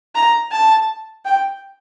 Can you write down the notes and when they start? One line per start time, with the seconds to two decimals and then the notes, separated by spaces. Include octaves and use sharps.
0.15 A#5
0.52 A5
1.25 G5